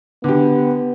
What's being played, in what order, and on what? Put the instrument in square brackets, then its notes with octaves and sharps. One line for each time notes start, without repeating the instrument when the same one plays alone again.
[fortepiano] D3 G4 [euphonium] B3